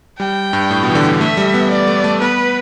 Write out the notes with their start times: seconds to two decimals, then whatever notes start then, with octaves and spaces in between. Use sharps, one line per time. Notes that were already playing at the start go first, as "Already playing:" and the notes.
0.19 G3 G5
0.53 G2
0.71 A2
0.83 B2
0.90 E3
0.95 D3
1.08 D3
1.21 A3 E5
1.37 G3
1.54 B3
1.71 G3 D5
1.88 A3
2.04 A3
2.21 B3 B4